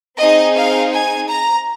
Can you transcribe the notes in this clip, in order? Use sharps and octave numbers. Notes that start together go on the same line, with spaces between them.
C4 D#4 G#4 D#5
F5
G#5
A#5